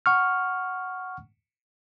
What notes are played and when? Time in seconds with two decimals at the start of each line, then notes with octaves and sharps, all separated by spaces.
0.06 F#5 C#6 F6